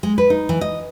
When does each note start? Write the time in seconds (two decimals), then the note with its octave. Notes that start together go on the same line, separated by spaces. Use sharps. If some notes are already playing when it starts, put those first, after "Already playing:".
0.03 G#3
0.18 B4
0.30 D#4
0.49 E3
0.61 D#5